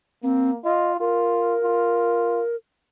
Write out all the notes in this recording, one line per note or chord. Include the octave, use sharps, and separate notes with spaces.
A#3 C4
F4 D#5
F4 A#4
F4